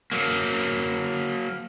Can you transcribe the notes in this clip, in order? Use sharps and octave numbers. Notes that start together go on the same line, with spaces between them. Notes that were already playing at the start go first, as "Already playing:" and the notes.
F#3 A#3